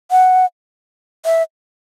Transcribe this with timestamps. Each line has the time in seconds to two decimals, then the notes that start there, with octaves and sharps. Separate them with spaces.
0.11 F#5
1.25 E5